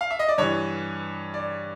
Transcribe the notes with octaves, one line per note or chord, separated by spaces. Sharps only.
F5
E5
D#5
D5
G2 E3 C#5
D5